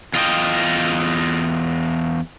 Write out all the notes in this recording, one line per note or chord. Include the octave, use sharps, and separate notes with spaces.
E2 F4 D#5 G5